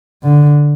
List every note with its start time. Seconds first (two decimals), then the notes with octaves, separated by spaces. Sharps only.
0.23 D3